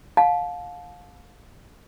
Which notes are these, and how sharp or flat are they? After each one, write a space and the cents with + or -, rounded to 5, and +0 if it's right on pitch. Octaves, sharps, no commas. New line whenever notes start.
F5 +30 A5 -25